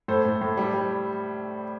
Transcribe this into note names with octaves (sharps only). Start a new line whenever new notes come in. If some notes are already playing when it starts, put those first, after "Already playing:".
A2 A4 C5
A2
A2
G3
G3